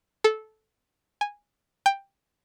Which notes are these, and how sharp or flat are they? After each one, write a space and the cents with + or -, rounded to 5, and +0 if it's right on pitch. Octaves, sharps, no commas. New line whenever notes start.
A4 -15
G#5 -10
G5 +10